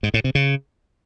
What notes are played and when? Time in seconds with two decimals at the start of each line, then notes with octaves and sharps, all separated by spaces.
0.03 G#2
0.14 A2
0.24 C3
0.35 C#3